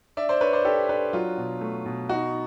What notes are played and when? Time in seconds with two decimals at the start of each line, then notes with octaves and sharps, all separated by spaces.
0.17 D4 D5 E5
0.29 C5 D5
0.41 D4 B4 C#5
0.53 C5 D5
0.65 D4 G4 A4
0.89 D4 A4 B4
1.13 F#3 F4
1.37 B2
1.61 A3
1.86 B2
2.09 D#4 F#4